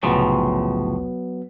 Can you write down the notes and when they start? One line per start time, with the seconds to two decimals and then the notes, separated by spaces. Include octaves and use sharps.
0.03 F1 C2 A2 C#3 F3 F#3 B3